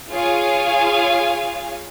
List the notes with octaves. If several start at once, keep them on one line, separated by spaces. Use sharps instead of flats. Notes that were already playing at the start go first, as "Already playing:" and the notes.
F4 G#4 C#5 F5 G#5